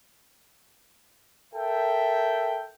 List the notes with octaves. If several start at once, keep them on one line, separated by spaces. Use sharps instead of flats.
A4 A#4 E5 G5